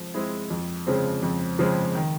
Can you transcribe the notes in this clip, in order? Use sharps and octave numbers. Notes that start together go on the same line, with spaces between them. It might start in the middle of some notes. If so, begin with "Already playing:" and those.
Already playing: F3 G#3 C4
G#3 C4 E4 G#4
F2
C#3 F3 G#3 C4
F2
C#3 F3 G#3 C4
D#3